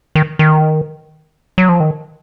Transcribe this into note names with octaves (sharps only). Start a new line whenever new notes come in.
D#3
D#3
F#3
F3
D#3